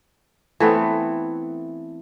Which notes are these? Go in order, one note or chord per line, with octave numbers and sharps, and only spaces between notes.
E3 A3 B3 C4